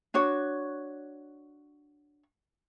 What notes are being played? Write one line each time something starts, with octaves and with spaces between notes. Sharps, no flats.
D4 F#4 C#5